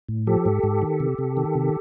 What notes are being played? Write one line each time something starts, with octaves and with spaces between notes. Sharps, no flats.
A2
F3 G4 A4
G#2
G#2
D#3
C3
C3
D#3
C3